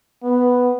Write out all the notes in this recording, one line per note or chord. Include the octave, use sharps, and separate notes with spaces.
B3